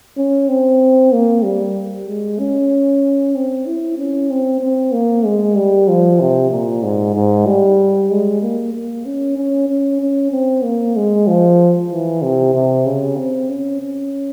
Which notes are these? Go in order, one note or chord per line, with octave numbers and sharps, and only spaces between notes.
C#4
C4
A#3
G3
G#3
C#4
C4
E4
C#4
C4
C4
A#3
G#3
G3
F3
C3
A#2
G#2
G#2
G3
G#3
A#3
A#3
C#4
C#4
C#4
C#4
C4
A#3
G#3
F3
E3
C3
C3
C#3
C4
C#4
C#4